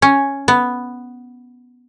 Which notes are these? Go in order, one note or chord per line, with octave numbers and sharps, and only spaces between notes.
C#4
B3